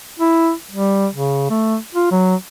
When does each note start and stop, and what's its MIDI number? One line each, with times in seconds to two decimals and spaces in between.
0.20 0.52 64
0.71 1.07 55
1.14 1.45 49
1.50 1.77 57
1.95 2.08 65
2.12 2.35 54